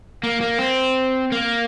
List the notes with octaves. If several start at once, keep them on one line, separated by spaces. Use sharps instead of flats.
A#3
A#3
C4
A#3